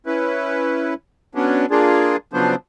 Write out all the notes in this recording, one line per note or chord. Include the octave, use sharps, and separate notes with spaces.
C#4 E4 B4
F#3 B3 C#4 D4
A#3 D4 F4 G#4
C#3 F3 F#3 B3 D4 C5